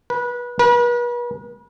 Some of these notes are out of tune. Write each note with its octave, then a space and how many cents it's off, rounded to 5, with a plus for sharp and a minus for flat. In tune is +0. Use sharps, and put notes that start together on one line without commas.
B4 -25
B4 -40